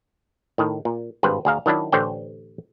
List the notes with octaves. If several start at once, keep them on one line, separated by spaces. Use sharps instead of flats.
A2 D#3
A#2
G#1 G2 B4 C5
D2 G#4 F5 A#5
D#3 F#3 D4 E4
A1 D3 C5 C#5 G5